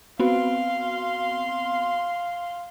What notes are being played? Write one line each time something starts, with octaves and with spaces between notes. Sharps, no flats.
B3 C4 F#4 F5 C6